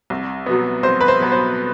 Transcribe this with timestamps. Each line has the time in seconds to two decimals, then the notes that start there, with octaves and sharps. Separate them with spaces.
0.10 C2
0.46 B2 F#3 B3
0.83 C2 C5
1.01 B4
1.08 C5
1.20 B2 F#3 B3
1.32 C5